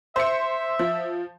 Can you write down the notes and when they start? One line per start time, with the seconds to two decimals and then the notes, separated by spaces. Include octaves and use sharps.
0.16 C5 E5 C#7
0.79 F3